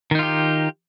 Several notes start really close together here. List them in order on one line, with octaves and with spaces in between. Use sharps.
D#3 D#4 F4 G4